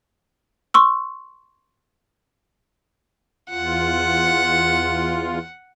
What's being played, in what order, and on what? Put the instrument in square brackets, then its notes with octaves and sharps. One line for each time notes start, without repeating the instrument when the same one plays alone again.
[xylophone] C6 C#6 E6
[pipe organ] E2 F4 [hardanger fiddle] F#5